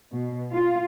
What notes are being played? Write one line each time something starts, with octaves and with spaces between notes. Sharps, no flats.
B2
F4